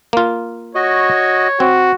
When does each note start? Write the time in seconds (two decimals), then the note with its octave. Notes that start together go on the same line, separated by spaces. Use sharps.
0.13 A#3 F4
0.75 F#4 C#5 D#5
1.60 C4 F#4